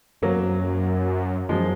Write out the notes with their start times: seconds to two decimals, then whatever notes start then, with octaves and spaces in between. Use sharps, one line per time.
0.22 F#2 F#3 A#3
1.49 F#2 F3 G#3